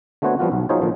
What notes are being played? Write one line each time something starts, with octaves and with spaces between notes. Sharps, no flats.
D3 A3 B3 F#4 C5 C#5
F3 G3 B3 F4 F#4
B1
F#3 D#4 F4 G#4 C5 C#5
A#2 D3 F3